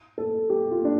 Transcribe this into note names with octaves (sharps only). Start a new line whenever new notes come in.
A4
G4
F4
D4